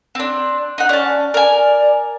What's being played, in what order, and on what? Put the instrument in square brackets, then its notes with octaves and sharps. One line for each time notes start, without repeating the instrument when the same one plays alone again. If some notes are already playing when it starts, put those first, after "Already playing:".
[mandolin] C4 D4
D#4 F#5
[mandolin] C#4 A5 [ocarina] D5
[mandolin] A#4 G#5 [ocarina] D5